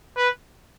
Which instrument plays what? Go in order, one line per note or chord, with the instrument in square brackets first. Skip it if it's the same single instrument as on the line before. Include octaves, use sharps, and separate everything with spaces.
[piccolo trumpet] B4